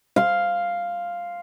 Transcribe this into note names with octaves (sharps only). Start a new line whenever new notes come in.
F5 C6